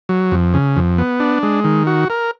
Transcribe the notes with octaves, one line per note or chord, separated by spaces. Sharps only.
F#3
F2
C#3
F2
B3
D4
G#3
D#3
F#4
A#4